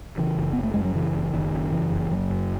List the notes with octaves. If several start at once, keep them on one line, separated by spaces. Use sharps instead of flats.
C#3 E3
F#1
F#1 B3
A3
F#2 G#3
F#3
C#3 E3
F#1
F#1 D#3
F#2
C#3 E3
F#1
F#1 F#3
F#2